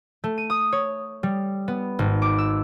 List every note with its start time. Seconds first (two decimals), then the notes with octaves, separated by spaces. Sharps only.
0.24 A3
0.38 D#7
0.50 D#6
0.72 C#5
1.23 G3
1.68 B3
1.99 G#1
2.22 D6
2.38 E6